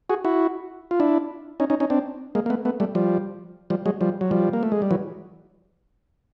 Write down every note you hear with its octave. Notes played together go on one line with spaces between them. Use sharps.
F#4 G#4
E4 F#4
F4
D4 E4
C#4 D#4
C#4 D#4
C#4 D#4
C4 D4
G#3 A#3
A#3
A3 B3
A3 B3
G3 A3
F3 G3
F3 G3
F#3 G#3
F3 G3
F#3
F3 G3
A#3
A3
G#3
G3
E3 F#3